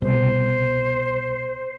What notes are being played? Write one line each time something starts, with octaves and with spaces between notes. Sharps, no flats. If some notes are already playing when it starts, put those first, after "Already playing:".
C2 B2 C5